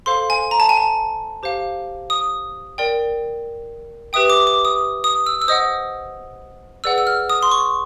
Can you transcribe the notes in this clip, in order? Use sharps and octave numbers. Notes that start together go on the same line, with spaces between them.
A4 C5 F5 C6
G#5
A#5
A5
G#5
A5
G4 C5 F5
D#6
A#4 D5 G5
G4 B4 E5 G5 D#6
D6
D6
D#6
D#6
E6
E6
C5 D#5 F#5 D#6
G#4 B4 D5 F#5 E6
E6
F6
D#6
C6
C#6